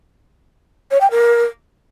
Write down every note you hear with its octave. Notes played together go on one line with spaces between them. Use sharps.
C#5
G5
A#4